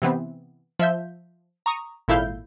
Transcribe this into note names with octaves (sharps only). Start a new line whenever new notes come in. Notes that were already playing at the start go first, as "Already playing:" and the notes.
C3 E3 B3 C4
F3 E5 G6
A#5 C#6 D#6
G#1 A#2 E4 A4 F5 G6